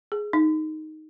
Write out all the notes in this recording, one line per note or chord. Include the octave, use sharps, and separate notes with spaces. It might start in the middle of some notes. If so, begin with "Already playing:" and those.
G#4
D#4